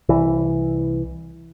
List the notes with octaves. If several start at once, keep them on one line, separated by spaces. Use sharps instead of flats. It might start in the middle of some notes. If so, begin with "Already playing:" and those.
C2 E3